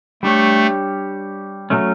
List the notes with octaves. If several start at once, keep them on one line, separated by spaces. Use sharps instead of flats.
G3 A3 D4 G4 C#5
B2 F#3 A3 C#4